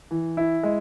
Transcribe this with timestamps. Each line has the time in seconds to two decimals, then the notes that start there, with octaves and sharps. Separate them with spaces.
0.11 E3
0.37 E4
0.63 G#3